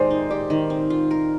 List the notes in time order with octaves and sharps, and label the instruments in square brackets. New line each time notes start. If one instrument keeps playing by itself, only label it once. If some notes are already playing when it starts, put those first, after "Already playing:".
Already playing: [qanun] D#3 G#3 G4 [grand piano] C5 D5
[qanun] D#4
[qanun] G4 [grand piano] D5
[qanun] D#3
C4
F4
A#4